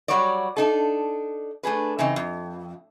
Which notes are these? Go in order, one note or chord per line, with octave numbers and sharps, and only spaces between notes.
F#3 G3 F#4 C#5 D5
D4 D#4 A4
A3 D4 G#4 B4
C#3 E3 C4 D#4
F2